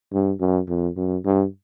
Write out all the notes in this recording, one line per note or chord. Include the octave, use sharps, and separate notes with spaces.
G2
F#2
F2
F#2
G2